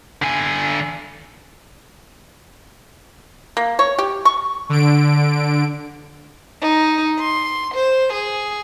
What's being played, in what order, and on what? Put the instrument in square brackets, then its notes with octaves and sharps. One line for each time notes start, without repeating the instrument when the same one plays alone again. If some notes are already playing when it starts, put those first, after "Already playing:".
[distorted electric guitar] D3 G#5
[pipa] A#3
C#5
G4
C#6
[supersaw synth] D3 D7
[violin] D#4
C6
C5
G#4